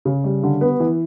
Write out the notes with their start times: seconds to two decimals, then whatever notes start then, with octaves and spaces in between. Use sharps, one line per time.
0.05 C#3
0.24 G3
0.43 D3
0.61 B3
0.80 E3